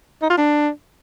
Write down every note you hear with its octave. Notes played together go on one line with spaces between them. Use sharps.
D#4
F4
D4